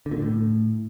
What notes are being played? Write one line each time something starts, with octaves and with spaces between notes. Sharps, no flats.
D3
A#2
D3
A2